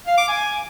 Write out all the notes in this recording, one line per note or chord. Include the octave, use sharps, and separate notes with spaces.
F5
D6
G#5